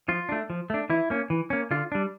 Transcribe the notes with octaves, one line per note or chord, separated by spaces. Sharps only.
F3 F4
A3 D4
F3
A3 D4
E3 E4
A#3 C#4
E3
A#3 C#4
D3 F4
G3 D4